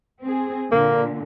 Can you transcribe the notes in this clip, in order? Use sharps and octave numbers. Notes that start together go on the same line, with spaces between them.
C4 G#4
A#2 D3 A#3